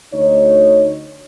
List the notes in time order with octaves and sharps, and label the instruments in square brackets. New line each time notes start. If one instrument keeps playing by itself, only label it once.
[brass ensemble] D2 D#4 C#5